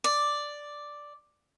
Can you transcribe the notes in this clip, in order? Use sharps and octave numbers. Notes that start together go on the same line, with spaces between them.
D5